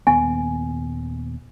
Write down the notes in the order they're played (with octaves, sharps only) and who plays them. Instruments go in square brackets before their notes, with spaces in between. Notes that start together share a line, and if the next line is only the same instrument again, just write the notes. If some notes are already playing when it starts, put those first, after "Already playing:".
[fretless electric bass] D#1 D#2 B3 [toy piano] G#5